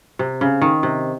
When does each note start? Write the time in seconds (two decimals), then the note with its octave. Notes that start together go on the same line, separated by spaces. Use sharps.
0.19 C3
0.41 C#3
0.61 D#3
0.83 C3